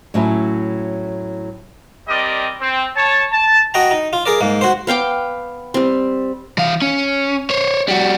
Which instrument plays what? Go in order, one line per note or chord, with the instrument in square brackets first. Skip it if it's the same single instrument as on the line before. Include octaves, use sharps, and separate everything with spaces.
[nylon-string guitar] A2 F#3 C#4 E4
[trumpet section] G3 C4 G4 A#4 D5 D#5
C4
C#5 A5
A5
[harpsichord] F#4 D#5 G5 A#5
D#4
F4
G#4 A#4 D5
G#2 A#3
F#4 C5
[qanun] B3 F5 G5 D6
G3 C4
[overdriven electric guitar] E3 F5
C#4
C5 C#5
G3 F#4